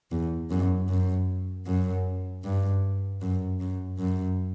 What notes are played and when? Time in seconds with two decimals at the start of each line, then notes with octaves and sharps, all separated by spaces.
0.12 E2
0.50 F#2
0.89 F#2
1.66 F#2
2.44 G2
3.22 F#2
3.60 F#2
3.99 F#2